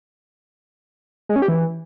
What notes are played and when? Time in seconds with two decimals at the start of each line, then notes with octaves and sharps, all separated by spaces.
1.29 G#3
1.36 C#4
1.42 G4
1.48 E3